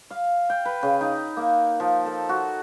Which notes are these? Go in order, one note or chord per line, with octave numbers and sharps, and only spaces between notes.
F5
G5
B4
C#3
D#4
A#3
F3
A4
F#4